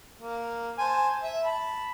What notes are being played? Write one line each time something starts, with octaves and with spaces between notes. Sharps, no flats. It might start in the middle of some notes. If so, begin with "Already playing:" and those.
A#3
C5 G#5 A5
E5
A5 B5